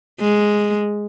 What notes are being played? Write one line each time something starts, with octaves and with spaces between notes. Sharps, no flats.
G#3